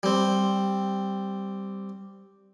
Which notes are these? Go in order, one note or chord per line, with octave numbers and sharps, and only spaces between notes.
G3 C4